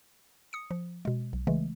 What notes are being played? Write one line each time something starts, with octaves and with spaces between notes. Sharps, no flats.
D#6 C#7
F3
B2 G#3
B1
C#3 E3 G#3 A3